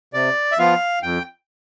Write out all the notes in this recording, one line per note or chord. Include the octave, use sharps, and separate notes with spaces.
C3 D5
E5
F3 B3 F4 F5
F2 G5